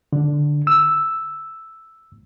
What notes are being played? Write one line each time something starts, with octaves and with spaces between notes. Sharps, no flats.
D3
E6